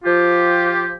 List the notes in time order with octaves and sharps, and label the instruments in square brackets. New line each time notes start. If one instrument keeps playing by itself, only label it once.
[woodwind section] F3 F4 G4